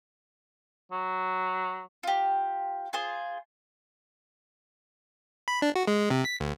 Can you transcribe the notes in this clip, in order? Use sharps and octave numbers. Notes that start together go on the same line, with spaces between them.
F#3
F4 G4
F4 G#4 C5
B5
D4
F#4
G#3
C3
B6
D2